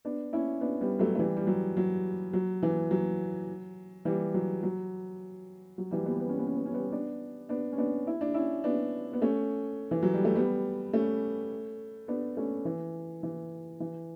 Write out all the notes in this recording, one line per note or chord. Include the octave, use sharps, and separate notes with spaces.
B3 D4
C#4 E4
B3 D4
G3 B3
F#3 A3
A3
E3 G3
G3
F#3
F#3
F#3
E3
F#3
E3 G3
F#3
F#3
F#3
E3 G3
G3 B3
B3
C#4
B3
C#4
B3
C#4
G3 B3
B3 D4
B3 D4
C#4
B3 D4
E4
D4
C#4 E4
B3 D4
B3
A3 C#4
E3
F#3
G3
A3
G3 B3
A3 C#4
B3 D4
A3 C#4
E3
E3
E3